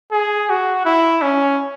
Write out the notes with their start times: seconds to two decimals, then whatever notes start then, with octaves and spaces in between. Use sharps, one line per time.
0.12 G#4
0.50 F#4
0.85 E4
1.22 C#4